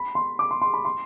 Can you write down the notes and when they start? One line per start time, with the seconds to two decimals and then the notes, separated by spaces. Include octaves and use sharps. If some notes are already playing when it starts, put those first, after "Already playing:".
Already playing: B5
0.15 C6
0.39 D6
0.51 C6
0.62 C6
0.74 B5
0.85 C6